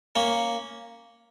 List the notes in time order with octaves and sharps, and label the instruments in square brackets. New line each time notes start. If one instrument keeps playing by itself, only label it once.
[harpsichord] A#3 C#4